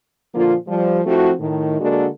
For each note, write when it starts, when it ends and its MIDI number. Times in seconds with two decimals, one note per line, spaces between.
0.35 0.56 46
0.35 0.56 50
0.35 0.56 53
0.35 0.56 58
0.35 0.56 65
0.68 0.99 53
0.68 0.99 55
1.06 1.32 53
1.06 1.32 57
1.06 1.32 60
1.06 1.32 64
1.06 1.32 66
1.40 1.77 45
1.40 1.77 51
1.81 2.07 50
1.81 2.07 56
1.81 2.07 58
1.81 2.07 62
1.81 2.07 66
1.81 2.07 69